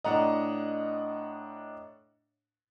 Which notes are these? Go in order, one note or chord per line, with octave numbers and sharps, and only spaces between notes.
A2 D4 D#5 F#5 A#5